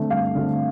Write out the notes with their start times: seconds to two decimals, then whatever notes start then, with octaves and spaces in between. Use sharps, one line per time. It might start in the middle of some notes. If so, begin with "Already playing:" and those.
Already playing: D3 A3 C4
0.10 G2 F5
0.35 D3 A3 C4